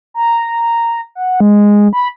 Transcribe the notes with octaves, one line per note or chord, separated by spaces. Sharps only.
A#5
F#5
G#3
B5